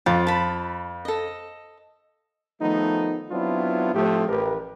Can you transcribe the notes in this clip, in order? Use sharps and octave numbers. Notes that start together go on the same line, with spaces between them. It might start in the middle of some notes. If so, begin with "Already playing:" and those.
F2 F4
A5 B5
A4 D#5
D#3 F3 A3 B3 D#4
F#3 B3 C4 D4 E4 F4
A2 F3 A3 C4 G4
A1 G4 A#4 B4